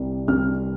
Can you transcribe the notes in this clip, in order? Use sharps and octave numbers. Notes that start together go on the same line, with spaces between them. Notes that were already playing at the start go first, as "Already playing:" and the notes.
Already playing: C2 C3 G3
C2 C3 G3 F6